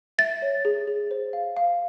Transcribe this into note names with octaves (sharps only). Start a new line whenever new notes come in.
E5 A6
C#5
G#4
G#4
C5
F5
F5